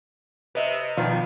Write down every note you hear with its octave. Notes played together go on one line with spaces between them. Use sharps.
C3 B4 D#5 E5
B2 D#3 F3 F4 D5